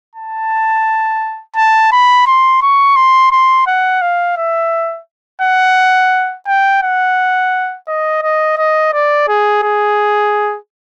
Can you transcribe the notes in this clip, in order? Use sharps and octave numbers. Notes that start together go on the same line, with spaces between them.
A5
A5
B5
C6
C#6
C6
C6
F#5
F5
E5
F#5
G5
F#5
D#5
D#5
D#5
D5
G#4
G#4